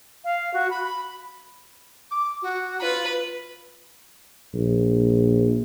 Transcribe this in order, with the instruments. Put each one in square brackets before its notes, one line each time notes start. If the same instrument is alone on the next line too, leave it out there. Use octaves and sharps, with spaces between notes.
[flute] F5
F#4
B5
B5
[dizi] D6
F#4
[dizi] F4 [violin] B4
[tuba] A#1